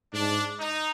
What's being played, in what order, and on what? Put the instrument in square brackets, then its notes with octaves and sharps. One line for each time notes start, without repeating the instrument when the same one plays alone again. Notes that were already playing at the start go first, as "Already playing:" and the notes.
[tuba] G#2 [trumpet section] D4
[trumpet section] D#4